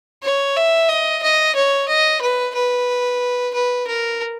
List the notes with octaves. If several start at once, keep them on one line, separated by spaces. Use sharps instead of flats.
C#5
E5
D#5
D#5
C#5
D#5
B4
B4
B4
A#4